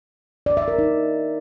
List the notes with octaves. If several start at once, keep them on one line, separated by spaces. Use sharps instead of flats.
D5
E5
A#4
D#4